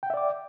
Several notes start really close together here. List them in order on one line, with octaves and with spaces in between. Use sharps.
G5 F#5 E5 D5 D6